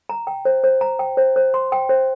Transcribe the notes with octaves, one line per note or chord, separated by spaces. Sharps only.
A#5
G5
C5
C5
A#5
G5
C5
C5
C6
G5
C5